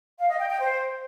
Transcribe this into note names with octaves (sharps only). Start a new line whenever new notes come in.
F5
D#5
G5
G5
C5